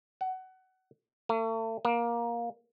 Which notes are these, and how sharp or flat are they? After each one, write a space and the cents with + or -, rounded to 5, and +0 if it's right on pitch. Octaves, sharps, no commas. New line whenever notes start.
F#5 +20
A3 +40
A#3 +15